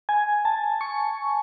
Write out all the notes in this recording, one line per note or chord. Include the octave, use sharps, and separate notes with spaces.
G#5
A5
C#6